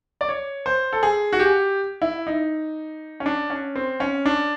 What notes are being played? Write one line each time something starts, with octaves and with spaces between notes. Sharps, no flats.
D5
C#5
C5
A4
G#4
F#4
G4
E4
D#4
C#4
D4
C#4
C4
C#4
D4